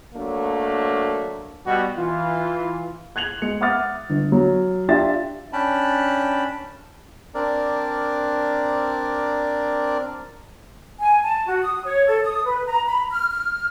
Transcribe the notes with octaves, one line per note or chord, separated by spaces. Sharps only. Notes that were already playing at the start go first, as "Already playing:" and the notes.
F#3 A3 A#3 D4
B2 G3 F#4
E3 F4
F#6 G#6 F7 F#7
G#3 G#4 C#7
E5 F#5 D6 D#6 F6 A6
G1
F#3
D4 F4 G4 E5 G5 A6
C#4 D4 G5 A5 B5
C4 D4 A#4 D5
G#5
A5
F#4
D#6
C#5
A4
D#6
B4
A#5
B5
F6
F6